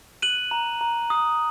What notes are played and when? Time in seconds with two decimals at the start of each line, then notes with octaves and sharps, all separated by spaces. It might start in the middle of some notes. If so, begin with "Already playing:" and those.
0.22 F#6 D#7 F#7
0.51 A#5
0.81 A#5
1.10 D#6